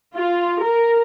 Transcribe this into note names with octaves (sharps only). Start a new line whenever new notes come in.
F4
A#4